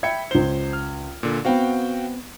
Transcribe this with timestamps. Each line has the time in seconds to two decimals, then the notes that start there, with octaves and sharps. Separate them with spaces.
0.03 E5 G5 B5 G#6 C#7
0.31 C#2 C5 G7
0.73 F6
1.23 A#2 D3
1.45 B3 C4 F#4 F5 G5